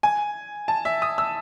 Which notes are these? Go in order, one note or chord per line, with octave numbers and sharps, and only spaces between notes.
G#5
A5
E5
D#6
E6